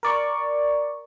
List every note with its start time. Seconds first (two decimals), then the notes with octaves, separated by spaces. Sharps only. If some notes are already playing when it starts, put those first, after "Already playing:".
0.03 A#4 D5 C#6